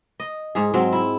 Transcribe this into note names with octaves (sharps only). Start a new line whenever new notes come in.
D#5
G#2 G#4
G#2 F#3 C4
E4